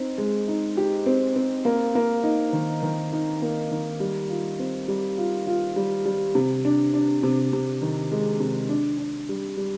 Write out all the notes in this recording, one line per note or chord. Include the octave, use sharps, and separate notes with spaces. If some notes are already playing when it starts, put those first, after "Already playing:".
Already playing: C4 D#4
G#3
D#4
G4
C4
C4
A#3
A#3
D#4
D#3
D#3
D#4
A#3
D#3
G3
F4
C4
G3
F4
F4
G3
G3
C3
D4
D4
C3
C3
D#3
G#3
C3
D4
D4
G3
G3